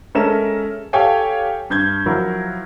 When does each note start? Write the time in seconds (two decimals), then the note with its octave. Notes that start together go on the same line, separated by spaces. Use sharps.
0.15 G#3 C#4 A4 A#4 E5 E7
0.93 G4 A4 C#5 F5 G5 G#5
1.70 G2 G6 G#6
2.06 F3 F#3 E4 F#4 A#4